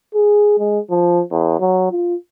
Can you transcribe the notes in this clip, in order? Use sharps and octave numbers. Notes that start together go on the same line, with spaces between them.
G#4
G#3
F3
E2
F#3
F4